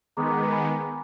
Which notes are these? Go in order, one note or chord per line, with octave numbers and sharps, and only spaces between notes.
D#3 G#3 B3 A#5 D6
A#5 D6
A#5 D6
G#5 B5